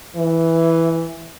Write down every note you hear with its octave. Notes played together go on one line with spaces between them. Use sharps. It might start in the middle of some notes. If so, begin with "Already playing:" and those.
E3